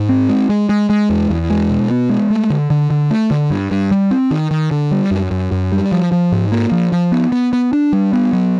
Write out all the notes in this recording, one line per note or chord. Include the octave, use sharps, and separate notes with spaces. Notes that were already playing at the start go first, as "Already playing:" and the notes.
Already playing: G#2
C4
G#3
G#3
G#3
G#3
E2
E2
G#3
B2
B3
G#3
A3
D3
D3
D3
A3
D3
G2
G2
G3
C4
D#3
D#3
D3
G3
F#2
F#2
F#2
G3
F3
F3
G#2
A#3
F3
F3
B3
B3
B3
D4
G3
B3
F#3